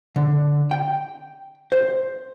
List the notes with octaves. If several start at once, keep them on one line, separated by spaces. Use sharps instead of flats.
D3
G5
C5